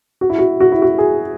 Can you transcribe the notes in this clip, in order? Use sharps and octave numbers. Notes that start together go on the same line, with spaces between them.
F#4
E4
F#4
F#4
E4
F#4
G#4